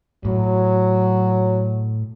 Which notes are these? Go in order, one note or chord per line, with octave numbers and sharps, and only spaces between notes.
A2 F#3